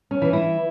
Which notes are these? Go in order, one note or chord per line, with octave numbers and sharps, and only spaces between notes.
C#4
E3
E4